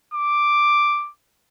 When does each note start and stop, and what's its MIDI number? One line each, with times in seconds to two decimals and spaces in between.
0.14 1.10 86